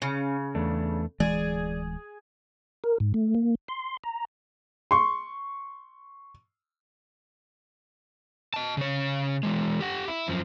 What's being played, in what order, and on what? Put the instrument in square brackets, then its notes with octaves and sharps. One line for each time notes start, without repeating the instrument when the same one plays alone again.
[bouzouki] C#3 [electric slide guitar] C#4
[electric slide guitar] E2 A3 D4
[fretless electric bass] D1 E3 G#3 [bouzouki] G#4 [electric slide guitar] D5
[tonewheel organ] A#4
G#2
A3
A#3
C6
A#5
[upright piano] C6 C#6
[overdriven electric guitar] D#5 A5
C#3 C#5
E3 G#3
G4 F#5
E4
F#2 F3